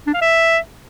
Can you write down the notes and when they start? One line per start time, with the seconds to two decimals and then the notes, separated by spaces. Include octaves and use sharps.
0.07 D4
0.14 F5
0.22 E5